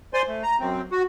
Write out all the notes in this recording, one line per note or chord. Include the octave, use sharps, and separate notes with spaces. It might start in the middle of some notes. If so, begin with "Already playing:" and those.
C5 D5 G#5 C6
A3
A#5
F#2 C4
F#4